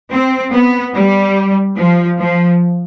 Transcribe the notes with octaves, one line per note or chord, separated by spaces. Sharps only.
C4
B3
G3
F3
F3